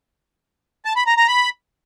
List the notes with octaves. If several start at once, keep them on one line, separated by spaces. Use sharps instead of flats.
A5
B5
A#5
A#5
B5